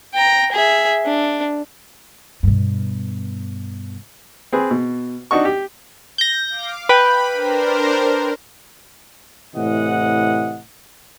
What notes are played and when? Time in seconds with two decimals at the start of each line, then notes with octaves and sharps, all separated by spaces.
0.14 G5 A#5
0.52 G#4 E5
1.05 D4
2.43 G2 B2
4.53 C4 G#4 B4
4.71 B2
5.31 D4 D#4 F#4 C#6
5.45 G4
6.18 G6 A#6
6.49 F5 D6
6.89 B4 G5 B5
7.32 D4 A#4 C5
9.56 A2 C3 E3 D#5 F#5